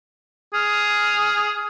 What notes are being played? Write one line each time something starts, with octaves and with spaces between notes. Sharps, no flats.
G#4 F6